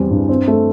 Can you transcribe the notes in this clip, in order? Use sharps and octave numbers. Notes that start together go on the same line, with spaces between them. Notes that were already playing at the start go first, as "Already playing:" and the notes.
Already playing: E2 G3 C4
G2
C4
A3